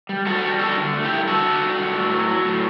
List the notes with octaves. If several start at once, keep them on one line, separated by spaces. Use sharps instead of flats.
G3
G3 F#4 A4
G3
G2 F#4 A4
D3
A3
E4 G4
G2
D3 F#4 A4
D3
G2
G2
A2
F#3
F#3
A2